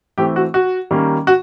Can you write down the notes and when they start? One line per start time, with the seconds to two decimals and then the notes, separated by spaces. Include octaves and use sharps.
0.18 E3 A3 C4 G4
0.36 F#4
0.54 F#4
0.91 D#3 G3 A#3 C#4
1.27 F#4